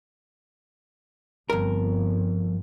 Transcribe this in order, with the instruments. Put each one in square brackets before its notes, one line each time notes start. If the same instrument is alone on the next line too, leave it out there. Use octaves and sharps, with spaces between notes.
[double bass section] G1 [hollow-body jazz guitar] F2 A#4